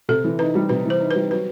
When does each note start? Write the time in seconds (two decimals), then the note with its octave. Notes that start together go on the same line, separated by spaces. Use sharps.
0.09 C3 A4
0.24 E3
0.39 D#4 B4
0.55 G3
0.69 C3 B4
0.85 E3 C5
1.00 D#4
1.11 G3 B4
1.31 F#3 B4